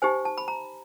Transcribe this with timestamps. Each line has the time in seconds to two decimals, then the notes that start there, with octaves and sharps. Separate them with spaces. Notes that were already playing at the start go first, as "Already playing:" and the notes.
0.02 D#4 G4 C5 G#5
0.25 A5
0.38 B5
0.48 A#5